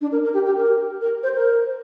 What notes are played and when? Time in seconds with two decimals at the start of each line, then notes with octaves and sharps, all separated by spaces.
0.01 D4
0.12 A#4
0.24 A#4
0.34 G4
0.46 G4
0.57 A#4
1.01 A#4
1.23 C5
1.35 A#4